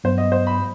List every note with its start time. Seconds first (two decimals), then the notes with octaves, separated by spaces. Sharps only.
0.04 G2 F#3 B3 C5
0.18 D#5
0.32 C5
0.47 B5